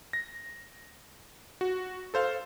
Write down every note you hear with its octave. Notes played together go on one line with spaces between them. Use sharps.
A#6
F#4
A4 C5 F5